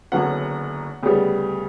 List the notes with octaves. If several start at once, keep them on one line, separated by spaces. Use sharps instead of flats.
F#1 F#2 D3 F#3 B3 F#5
D2 C#3 G3 B3